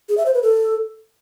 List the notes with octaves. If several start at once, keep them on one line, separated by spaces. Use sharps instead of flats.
G#4
E5
C5
B4
A4